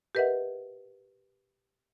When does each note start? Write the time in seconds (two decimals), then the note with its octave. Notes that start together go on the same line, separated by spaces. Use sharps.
0.15 G4 A#4 B4 D#5 E5 F#5